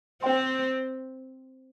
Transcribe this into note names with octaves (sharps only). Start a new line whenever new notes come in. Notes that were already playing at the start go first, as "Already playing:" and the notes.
C4 C5 G5 C6